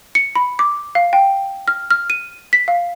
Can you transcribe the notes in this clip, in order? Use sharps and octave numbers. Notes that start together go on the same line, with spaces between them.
C#7
B5
D6
F5
G5
F6
F6
D#7
B6
F5